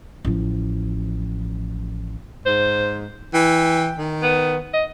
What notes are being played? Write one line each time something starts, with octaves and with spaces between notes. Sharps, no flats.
A1 F3
G#2 C5
E3 G5
D#3
B3
D#5